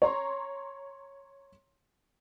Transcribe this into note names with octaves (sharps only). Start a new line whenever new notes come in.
C#5 A#5 C6